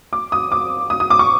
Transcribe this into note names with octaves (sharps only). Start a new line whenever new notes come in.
D6
D#6
D6
D#6
D#6
D6
C#6